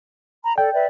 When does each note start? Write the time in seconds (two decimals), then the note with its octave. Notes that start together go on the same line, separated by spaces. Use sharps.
0.43 A#5 B5
0.58 A4 D5 G5
0.74 B4 D5 E5